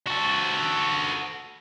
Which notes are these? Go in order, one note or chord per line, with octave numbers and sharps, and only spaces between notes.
F#4 A4